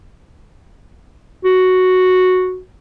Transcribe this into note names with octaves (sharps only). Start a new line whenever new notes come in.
F#4